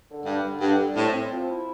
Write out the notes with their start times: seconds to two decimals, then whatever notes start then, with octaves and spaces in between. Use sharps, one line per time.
0.09 D3
0.26 G2 G3
0.44 D3
0.61 G2 D3
0.79 G3
0.95 A2 C4
1.13 C4
1.31 F3
1.48 E4